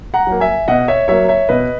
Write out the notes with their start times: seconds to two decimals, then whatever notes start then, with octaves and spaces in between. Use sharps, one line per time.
0.14 F#5 A#5
0.27 F#3 A#3
0.40 E5 G#5
0.68 B2 D#5 F#5
0.88 C#5 E5
1.08 F#3 A#3 C#5 E5
1.28 C#5 E5
1.49 B2 B4 D#5